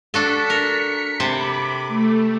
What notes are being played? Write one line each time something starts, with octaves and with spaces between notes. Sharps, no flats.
D4 F#4 A4 B6 C#7
A#4
C3 A5 B5 D6
A3